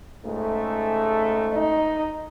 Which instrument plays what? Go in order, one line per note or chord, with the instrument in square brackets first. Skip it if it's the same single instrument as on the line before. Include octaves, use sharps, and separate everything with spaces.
[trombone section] C#2 G#2 A3
[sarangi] D#4